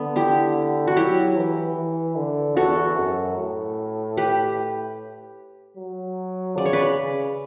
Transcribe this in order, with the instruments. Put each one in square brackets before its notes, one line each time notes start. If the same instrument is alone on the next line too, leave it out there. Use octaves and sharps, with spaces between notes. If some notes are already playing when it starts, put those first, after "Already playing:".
Already playing: [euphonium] D3 [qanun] B3
[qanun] E4 G4
F#4
[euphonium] F#3 [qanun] E4 G4
[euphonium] E3
E3
D3
[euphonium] E2 [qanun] F#4 A4
[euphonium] F#2
A2
[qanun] G4 B4
[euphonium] F#3
[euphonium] C#3 [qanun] D5
[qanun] C#5
B4 D5
[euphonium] C#3